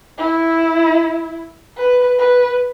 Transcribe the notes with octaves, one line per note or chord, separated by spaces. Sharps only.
E4
B4
B4